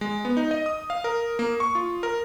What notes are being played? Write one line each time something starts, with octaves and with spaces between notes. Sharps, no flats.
G#3
B3
D#4
D#5
D#6
F5
A#4
A#3
C#6
F4
A#4